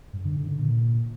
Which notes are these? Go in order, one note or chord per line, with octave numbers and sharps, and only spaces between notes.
G2
D3
D3
D3
A#2